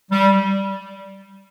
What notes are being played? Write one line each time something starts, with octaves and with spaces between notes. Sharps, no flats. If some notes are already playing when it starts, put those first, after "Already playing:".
G3